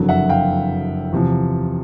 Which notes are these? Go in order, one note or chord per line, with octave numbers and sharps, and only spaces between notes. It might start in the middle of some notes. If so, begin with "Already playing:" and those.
Already playing: F#1 F2 D3 F#3
E5 F#5
F5 G5
E2 C3 F3